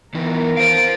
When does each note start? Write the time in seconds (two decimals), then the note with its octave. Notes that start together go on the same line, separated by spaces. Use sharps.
0.15 E3 B3 D#4 A#4
0.57 C5 F5 D7